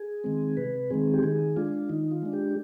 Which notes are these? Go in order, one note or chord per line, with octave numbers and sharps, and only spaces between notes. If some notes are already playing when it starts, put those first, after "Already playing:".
Already playing: G#4
D#3 G#3 C4
C3 B4
D#3 G#3 C4 G#4
G4
D#3 G#4
G#3 D4 F4
D#3 D#4
F4
G#3 D4
G4